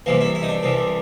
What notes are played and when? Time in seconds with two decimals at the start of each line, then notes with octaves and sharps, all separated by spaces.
0.06 C2 C3 E3 A#3
0.21 E4
0.35 E4
0.43 D#4
0.49 D4
0.63 C2 C3 E3